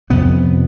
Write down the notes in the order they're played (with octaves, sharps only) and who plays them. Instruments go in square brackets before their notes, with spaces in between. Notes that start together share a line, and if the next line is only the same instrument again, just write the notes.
[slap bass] F2 C3 B3 C#4